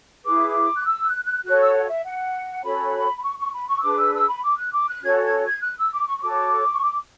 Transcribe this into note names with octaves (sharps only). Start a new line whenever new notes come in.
E4 G#4 B4 D6
F#6
E6
F#6
F#6
F#4 A4 C#5 F#6
E6
F#5
F#5
E5
F#5
C#4 F#4 A4 C#5 B5
B5
C#6
C#6
B5
C#6
E6
D4 G#4 B4 D6
E6
E6
B5
D6
F#6
D6
F#6
C#4 F#4 A4 C#5 G#6
G#6
G#6
F#6
E6
D6
C#6
C#6
F#4 A4 C#5 D6
C#6
D6